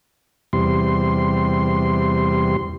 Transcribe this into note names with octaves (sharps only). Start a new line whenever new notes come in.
E2 C3 G3 C6